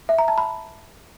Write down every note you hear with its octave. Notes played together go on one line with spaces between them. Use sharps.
E5
A#5
A5
B5